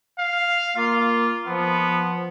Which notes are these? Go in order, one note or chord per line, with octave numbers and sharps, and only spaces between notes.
F5
A#3 F4
F3 B3